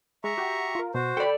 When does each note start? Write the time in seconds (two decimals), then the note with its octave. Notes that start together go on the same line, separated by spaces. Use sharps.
0.24 G#3 E5 A#5 C#6
0.38 F#4 G4
0.75 F4 A#4
0.94 B2 F#4 C5
1.17 A4 D5 G5 B5